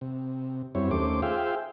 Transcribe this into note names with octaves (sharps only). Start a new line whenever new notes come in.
C3
F#2 G3 C4 E4 C#5
D#2 A3 C#4 C5 D6
F4 G#4 C5 E5 F5 G5